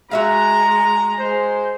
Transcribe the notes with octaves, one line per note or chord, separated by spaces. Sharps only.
G#3 F#4 E5 F5 A#5
G#3 C5